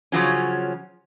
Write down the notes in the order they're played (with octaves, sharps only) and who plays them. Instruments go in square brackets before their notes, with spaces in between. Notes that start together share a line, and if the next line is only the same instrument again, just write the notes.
[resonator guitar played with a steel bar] C#3 F3 F#3 C#4